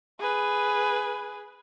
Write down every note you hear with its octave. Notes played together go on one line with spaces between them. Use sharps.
G#4 B4